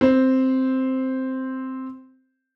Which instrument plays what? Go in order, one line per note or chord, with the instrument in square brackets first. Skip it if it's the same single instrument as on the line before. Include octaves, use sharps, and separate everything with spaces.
[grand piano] C4 C5